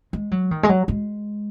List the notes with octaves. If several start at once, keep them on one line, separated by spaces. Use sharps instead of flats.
G#3
F#3
D#3
G#3
F#3
G#3